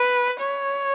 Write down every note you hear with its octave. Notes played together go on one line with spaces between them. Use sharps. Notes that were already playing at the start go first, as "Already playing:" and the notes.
Already playing: B4
C#5